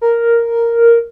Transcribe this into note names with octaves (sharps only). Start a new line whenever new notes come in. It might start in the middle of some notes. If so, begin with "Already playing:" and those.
A#4